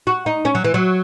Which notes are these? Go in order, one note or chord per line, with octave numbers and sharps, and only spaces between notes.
F#4
D#4
C#4
F#3
E3
F#3